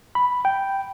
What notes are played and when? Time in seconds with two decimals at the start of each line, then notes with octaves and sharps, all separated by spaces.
0.15 B5
0.45 G5